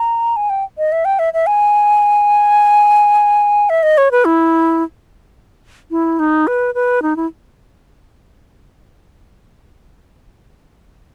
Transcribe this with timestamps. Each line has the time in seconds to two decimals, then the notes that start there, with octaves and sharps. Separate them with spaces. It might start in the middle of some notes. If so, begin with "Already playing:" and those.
Already playing: A#5
0.36 G#5
0.50 G5
0.78 D#5
0.92 E5
1.05 G5
1.19 E5
1.34 E5
1.47 G#5
3.70 E5
3.83 D#5
3.98 C#5
4.12 B4
4.25 E4
5.91 E4
6.19 D#4
6.47 B4
6.75 B4
7.02 D#4
7.16 E4